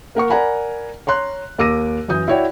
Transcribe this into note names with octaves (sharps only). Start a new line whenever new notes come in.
A#3 A#4 F#5 C#6
A#4 D5 F#5 G#5 A#5 B5
C#5 A#5 C6 F#6
D#2 A#4 D6 E6 A#6 D#7
F#2 E3 D#6 G6
E4 F#4 C#5 D5 G5